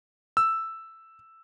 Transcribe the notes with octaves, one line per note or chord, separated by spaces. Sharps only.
E6